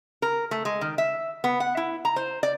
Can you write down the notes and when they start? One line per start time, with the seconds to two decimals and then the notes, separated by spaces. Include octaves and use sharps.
0.22 A#4
0.51 A3
0.65 G#3
0.81 D#3
0.98 E5
1.44 B3
1.60 F#5
1.77 E4
2.05 A#5
2.16 C5
2.43 D5